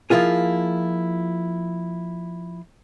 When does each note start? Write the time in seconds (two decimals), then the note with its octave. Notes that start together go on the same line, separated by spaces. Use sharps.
0.10 F3 A#3 E4 F4 G#4